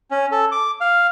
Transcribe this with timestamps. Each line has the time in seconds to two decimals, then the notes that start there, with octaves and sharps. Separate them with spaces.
0.11 C#4
0.32 A4
0.52 D6
0.81 F5